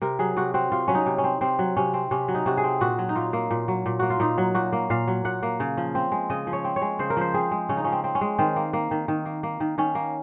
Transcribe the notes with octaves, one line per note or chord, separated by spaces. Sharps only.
C3 A#4
F#3 G#4
C3 F#4
C4 F#4
C3 F4
F#3 C#4
D#4
C3
C#4
C4
C3 C4
F#3
C3 C#4
C4
C3 C#4
F#3
D#4
C3 F#4
G#4
C4
A#2 F#4
F#3
D#4
A#2 F4
A#3
A#2
F#3
A#2
A#3 F#4
F4
A#2 D#4
F#3
A#2 F#4
A#3
A#2 F5
F#3
A#2 F#5
A#3
C#3
F3
C4
G#3
C#3 D#5
F3
C#5
C4
C#5
G#3
C#3 C5
A#4
F3 C5
C4 G#4
G#3
C#3 C#4
D#4
F3 C#4
C4
C4
C#4
G#3
D#3 C4
A#3
A#3
D#3
D#3
A#3
A#3
D#3
D#3 C#4
A#3